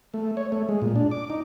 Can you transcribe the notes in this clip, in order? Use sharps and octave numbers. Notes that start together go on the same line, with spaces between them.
A3
C#5
A3
G#3
A#2
D4
D6
D#4